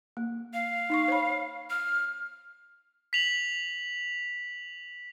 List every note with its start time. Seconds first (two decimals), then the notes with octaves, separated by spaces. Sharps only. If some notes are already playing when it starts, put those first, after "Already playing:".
0.17 A#3
0.54 F5
0.90 D#4 C6 C#6
1.08 C5 C#5 B5
1.70 F6
3.13 B6 F7 F#7